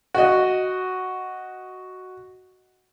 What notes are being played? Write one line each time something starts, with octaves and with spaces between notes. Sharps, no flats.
F#4 D#5